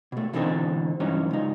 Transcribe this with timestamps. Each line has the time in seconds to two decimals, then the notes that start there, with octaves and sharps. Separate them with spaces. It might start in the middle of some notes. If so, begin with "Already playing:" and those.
0.12 B2 A3
0.33 B2 D3 E3 C4 D#4 A4
1.00 G2 E3 F#3 C#4 D#4
1.31 C#2 D#4